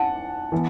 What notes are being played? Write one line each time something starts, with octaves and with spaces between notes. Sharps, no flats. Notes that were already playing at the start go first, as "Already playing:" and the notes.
Already playing: F#5 A5
E3 B3